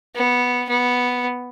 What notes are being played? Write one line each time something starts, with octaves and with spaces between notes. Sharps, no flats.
B3
B3